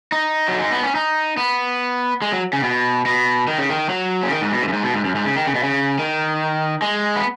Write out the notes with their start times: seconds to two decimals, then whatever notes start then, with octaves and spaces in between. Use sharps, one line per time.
0.12 D#4
0.48 F#3
0.59 G#3
0.72 B3
0.83 C#4
0.95 D#4
1.37 B3
2.22 G#3
2.32 F#3
2.53 C#3
2.63 B2
3.06 B2
3.48 D#3
3.58 C#3
3.70 D#3
3.89 F#3
4.23 C#3
4.31 D#3
4.41 G#2
4.52 B2
4.62 G#2
4.68 F#2
4.73 G#2
4.83 B2
4.94 G#2
5.05 F#2
5.15 G#2
5.25 C#3
5.36 D#3
5.47 C#3
5.55 B2
5.63 C#3
5.99 D#3
6.82 G#3
7.16 B3